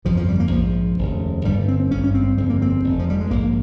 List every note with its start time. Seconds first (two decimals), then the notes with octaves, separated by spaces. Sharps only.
0.05 G1 F2 C#3 F3
0.17 F3
0.28 G3
0.40 A#3
0.52 A#1 G#2 F3
0.98 F1 D#2 C#3
1.45 G1 G2 G3
1.68 C4
1.80 C4
1.91 G#1 G2 C#4
2.04 C#4
2.15 C4
2.37 G1 F2 C#3 C4
2.49 A#3
2.62 C4
2.84 F1 F2 C3
2.99 F3
3.10 G3
3.20 G#3
3.31 A#1 G#2 A#3